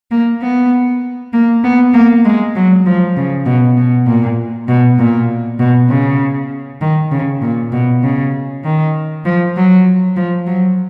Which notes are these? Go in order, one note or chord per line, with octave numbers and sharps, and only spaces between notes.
A#3
B3
A#3
B3
A#3
G#3
F#3
F3
C#3
B2
B2
A#2
B2
A#2
B2
C#3
D#3
C#3
A#2
B2
C#3
D#3
F3
F#3
F3
F#3